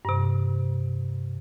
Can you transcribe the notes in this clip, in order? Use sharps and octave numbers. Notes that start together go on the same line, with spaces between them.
G2 C3